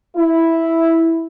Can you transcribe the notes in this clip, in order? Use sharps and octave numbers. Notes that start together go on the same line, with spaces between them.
E4